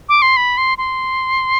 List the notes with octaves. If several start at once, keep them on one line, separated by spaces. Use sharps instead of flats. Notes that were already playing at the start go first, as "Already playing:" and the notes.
D6
C6
B5
C6
C6